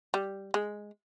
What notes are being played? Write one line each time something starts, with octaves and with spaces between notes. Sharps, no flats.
G3
G#3